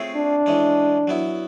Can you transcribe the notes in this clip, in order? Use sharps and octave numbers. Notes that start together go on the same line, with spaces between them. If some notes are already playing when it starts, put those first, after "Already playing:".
Already playing: A3 C4 F4 G#4 C#5
D4
E3 G#3 C#4
F#3 B3 E4